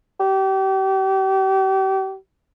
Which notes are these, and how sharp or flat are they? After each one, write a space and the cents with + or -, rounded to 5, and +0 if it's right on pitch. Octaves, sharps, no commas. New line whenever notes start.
G4 -35